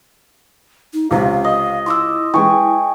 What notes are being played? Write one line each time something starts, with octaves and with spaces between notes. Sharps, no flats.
D#4
C#2 C3 F5
D#5
E4 C6 D6 E6
E3 G#3 G5 G#5 C#6